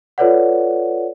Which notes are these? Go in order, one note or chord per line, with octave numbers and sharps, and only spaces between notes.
F4 A4 B4 C#5 D5 F#5